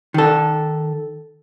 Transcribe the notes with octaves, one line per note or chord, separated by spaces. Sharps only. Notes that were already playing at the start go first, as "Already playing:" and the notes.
D#3 A4